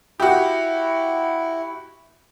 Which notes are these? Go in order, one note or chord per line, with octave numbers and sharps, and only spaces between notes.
E4 F#4 G4